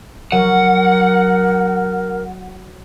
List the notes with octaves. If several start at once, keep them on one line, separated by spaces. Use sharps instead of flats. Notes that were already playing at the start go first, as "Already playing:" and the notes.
F#3 A#4 F#5